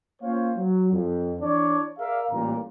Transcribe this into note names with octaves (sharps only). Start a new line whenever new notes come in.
A#3 C#4 F4 C5 C#5 F5
F#3
F2
E3 D4 E4 C#5 D5
G#4 A#4 D5 E5 F5
A1 A#2 E3 G3 A#4 A#5